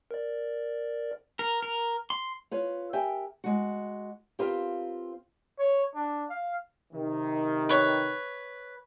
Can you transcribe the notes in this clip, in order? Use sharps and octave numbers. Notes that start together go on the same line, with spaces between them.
A#4 D5
A#4
A#4
C6
F4 B4 C#5
G4 A#4 E5 G5 G#5
G#3 F#4
C4 F4 G4 A#4 B4 F5
C#5
D4
F5
C3 D#3
B4 C#5